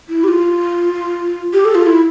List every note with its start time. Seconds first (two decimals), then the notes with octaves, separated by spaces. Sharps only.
0.09 E4
0.24 G4
0.28 F4
1.53 G4
1.65 A4
1.75 F4
1.87 E4